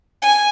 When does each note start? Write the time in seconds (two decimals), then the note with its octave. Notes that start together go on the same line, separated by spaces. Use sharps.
0.22 G#5